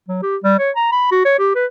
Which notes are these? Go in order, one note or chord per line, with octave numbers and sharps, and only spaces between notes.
F#3
G4
G3
C#5
A#5
B5
F#4
C#5
G4
B4